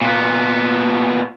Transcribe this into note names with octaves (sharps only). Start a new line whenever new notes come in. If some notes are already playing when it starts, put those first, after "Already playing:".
A#2 B3